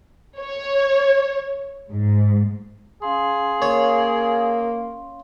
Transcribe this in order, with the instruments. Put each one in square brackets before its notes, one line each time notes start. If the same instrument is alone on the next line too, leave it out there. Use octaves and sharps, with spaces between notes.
[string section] C#5
G#2
[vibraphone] C#4 F5 C6 [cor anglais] G#4
[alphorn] A#3 [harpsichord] C#5